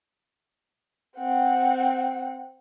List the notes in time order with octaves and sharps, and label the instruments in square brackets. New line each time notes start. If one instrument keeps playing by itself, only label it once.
[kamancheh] C4 F#5